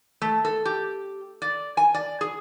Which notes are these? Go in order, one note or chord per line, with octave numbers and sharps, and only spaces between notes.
A3
A4
G4
D5
G#5
D5
G#4